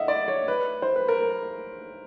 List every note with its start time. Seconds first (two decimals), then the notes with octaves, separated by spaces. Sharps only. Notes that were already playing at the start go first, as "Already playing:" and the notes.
Already playing: D#5 E5 F#5
0.08 D5
0.28 C#5
0.48 B4
0.82 C5
0.96 B4
1.08 A#4